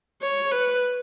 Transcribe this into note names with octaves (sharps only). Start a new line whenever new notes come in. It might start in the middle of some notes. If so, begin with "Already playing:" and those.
C#5
B4